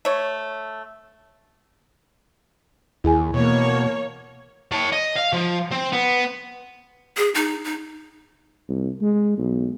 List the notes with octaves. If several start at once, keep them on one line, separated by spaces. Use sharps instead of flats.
A3 C#5
D#2 E4 G#4 G#5
B2 E3 A#3 C#5
C#5 A5
D#5
F5
F3
C4
B3
G#4
D#4
D#4
C2
G#3
B1